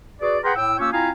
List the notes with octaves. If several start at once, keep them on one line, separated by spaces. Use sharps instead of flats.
F#4 G#4 B4 D5
G#4 B4 F#5 G5 A#5 C6
A2 G5 E6
A#3 C#4 F4 G4 C#5 E6
C4 E4 F4 F5 G#5 A#5